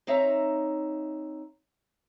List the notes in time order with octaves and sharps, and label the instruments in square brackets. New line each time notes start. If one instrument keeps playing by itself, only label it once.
[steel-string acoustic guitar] C4 D#4 C#5 E5 A#5